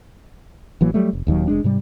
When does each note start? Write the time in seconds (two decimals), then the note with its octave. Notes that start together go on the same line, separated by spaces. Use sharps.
0.81 A1 E3 F#3 A#3
0.94 F#3 G3 A3
1.13 F1
1.27 D#1 D#2 D#3 F#3
1.48 F1 G#3 D4
1.64 G#2 C3 G3